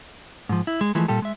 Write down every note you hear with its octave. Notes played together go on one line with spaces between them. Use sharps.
G#2 F3
E4
G#3
E3 F3 G#3 A3
A#2 G3 G4 A4
G#3 E5